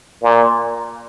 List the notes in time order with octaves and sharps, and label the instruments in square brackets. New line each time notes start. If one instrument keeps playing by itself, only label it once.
[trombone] A#2